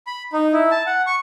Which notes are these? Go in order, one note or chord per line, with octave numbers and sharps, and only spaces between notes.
B5
D#4
E4
A5
F#5
C#6